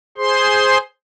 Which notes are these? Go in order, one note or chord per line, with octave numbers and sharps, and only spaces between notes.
G#4 C5 C6